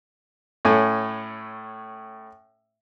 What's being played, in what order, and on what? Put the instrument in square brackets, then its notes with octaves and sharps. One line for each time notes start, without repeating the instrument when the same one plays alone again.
[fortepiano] A2 A3 C#4 G#5